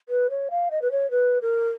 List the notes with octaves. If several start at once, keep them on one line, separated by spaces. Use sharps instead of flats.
B4
C#5
F5
D#5
B4
C#5
B4
A#4